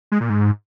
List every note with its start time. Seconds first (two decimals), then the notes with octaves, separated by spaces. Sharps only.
0.12 G#3
0.21 A#2
0.30 G#2